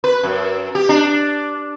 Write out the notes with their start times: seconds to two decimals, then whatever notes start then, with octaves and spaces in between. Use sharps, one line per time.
0.04 B4
0.23 F#2
0.75 G4
0.89 D4